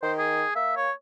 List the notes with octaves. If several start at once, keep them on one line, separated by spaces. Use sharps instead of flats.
D#3 C5
G#4
A#3 E5
C#5